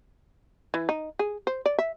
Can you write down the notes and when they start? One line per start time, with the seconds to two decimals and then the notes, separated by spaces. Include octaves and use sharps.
0.74 E3
0.89 D#4
1.19 G#4
1.47 C5
1.66 D5
1.78 E5